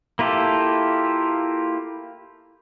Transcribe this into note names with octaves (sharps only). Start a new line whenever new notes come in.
A#3 E4 F4 G4 A4